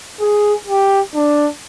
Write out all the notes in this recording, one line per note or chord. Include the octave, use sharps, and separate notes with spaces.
G#4
G4
D4